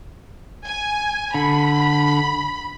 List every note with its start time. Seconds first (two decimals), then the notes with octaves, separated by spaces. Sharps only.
0.65 G#5
1.34 D3 B5